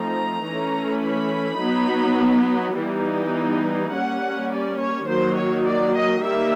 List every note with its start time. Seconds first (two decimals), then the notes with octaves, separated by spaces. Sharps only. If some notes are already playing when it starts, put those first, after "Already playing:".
Already playing: F3 A3 C4 D#4 A#5
0.46 E3 A3 C#4
1.04 B5
1.61 F#3 B3 D#4
2.77 E3 G3 B3 D#4
3.93 G3 A#3 C#4 F#5
4.51 D5
4.80 C#5
5.08 D#3 F#3 A#3 D#4 C5
5.37 C#5
5.66 D5
5.95 D#5
6.24 D#3 G3 A#3 E5